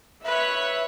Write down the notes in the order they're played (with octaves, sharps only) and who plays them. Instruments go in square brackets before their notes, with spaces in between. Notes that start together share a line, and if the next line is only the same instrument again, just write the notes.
[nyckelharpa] B4 C#5 [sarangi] E5